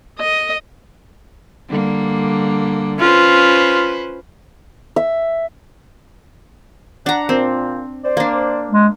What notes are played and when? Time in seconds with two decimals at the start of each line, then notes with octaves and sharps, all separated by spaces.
0.19 D#5
1.69 D3 G3 A#3
2.99 C#4 F4 B4 C5
4.96 E5
7.06 D4 F#5 A#5
7.29 A#2 C4
8.04 C5 D5
8.17 A#3 D4
8.71 G#3